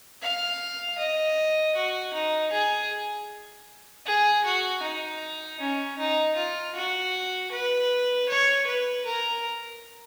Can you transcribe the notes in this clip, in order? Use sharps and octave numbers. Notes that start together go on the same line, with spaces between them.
F5
D#5
F#4
D#4
G#4
G#4
F#4
D#4
C#4
D#4
F4
F#4
B4
C#5
B4
A#4